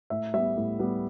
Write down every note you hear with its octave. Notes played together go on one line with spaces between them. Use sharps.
A2 E5
G3 B3 E5
A2
G3 B3